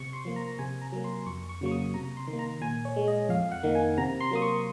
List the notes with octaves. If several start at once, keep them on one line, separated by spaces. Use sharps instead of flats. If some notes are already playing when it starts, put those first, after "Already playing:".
Already playing: C3 C#6
C6
F3 A#3
A#5
C3 G#5
A#5
F#3 A#3
C6
F2 C#6
C#6
C#3 F#3 A#3 C#6
D#6
C3 A#5
C6
D#3
A#3
A#5
A#2 G#5
C#5
G#3
D#5
F2 F5
F#5
D#3 A#3
G#5
C3 A#5
C6
F#3 A#3 D#6
C#6